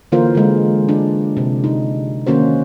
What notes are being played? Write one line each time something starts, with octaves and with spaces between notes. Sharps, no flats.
D3 E3 A#3 F4 A#4 C5
D3 G#3
D4
C3
D#4
D#3 A#3 C#4 F#4 C5